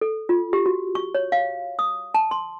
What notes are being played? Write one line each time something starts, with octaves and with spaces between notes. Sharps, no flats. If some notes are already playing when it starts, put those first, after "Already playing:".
A4
F4
G4
F#4
C#6
C#5
F5
D#6
A5
C6